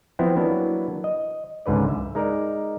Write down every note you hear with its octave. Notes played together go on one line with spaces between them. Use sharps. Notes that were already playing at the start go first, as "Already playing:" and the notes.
F3 B3 C4 E4
F#3 A#3 B3 D4 E4
D#5
C#2 G#2 D3 B4 D5
E5
G#3 D#4 A#4 D5